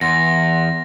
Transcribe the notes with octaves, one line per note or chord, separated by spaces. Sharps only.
E2 F#5 C6 A#6